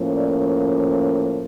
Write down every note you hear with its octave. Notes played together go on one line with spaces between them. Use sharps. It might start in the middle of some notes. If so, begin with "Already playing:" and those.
Already playing: A2 F3 A#3 C#4
D5
C#5